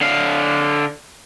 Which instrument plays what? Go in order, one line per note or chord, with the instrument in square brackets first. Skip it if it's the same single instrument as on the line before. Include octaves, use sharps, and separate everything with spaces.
[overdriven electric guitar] D3 F5